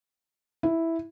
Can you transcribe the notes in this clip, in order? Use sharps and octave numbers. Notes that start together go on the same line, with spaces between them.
E4